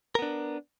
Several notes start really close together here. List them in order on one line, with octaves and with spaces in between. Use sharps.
A#4 B3 D4